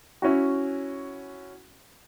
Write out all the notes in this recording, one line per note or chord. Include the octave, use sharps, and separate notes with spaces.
C#4 E4 F#4